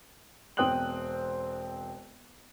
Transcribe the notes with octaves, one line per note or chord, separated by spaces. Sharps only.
E1 C4 G5 D#6 F#6 F#7